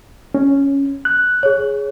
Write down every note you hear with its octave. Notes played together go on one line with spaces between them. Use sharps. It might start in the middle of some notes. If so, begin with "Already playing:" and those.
C#4
F#6
G#4 C#5